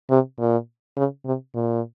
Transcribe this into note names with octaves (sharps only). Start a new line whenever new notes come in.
C3
A#2
C#3
C3
A#2